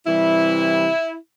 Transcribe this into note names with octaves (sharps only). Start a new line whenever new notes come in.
C3 E3 G3 E4